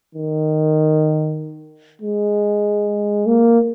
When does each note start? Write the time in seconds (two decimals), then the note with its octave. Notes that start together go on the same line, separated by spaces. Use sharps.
0.15 D#3
2.02 G#3
3.26 A#3